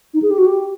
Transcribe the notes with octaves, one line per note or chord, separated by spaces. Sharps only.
D#4
G#4
G4
F#4
G4